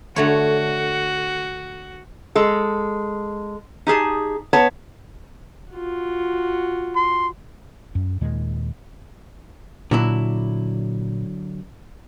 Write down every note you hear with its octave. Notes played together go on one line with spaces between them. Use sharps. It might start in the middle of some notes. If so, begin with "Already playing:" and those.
D3 A3 F#4 C#5
G#3 A4
D#4 G4 G#4 A5
B3 C#5 A5
F4 F#4
C6
F#2
D#2 A#2 D#3 G#3
A#2 D3 F#3 E4